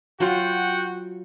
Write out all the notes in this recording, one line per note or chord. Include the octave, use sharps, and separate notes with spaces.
F#3 F4 F#4 C5 F#5 G5